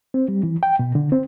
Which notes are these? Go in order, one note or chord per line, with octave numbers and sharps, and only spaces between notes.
C4
G3
E3
G5
B2
D3
C4